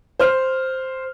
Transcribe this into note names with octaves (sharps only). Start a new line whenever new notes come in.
C5 F6